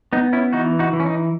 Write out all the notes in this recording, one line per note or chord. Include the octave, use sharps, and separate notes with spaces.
B3 D#4
C#4 E4
E3 D#4 F#4
D#4 F#4
E3
C#4
D#4